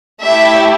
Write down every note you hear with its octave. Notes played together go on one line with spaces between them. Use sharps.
A3 E4 G4 E5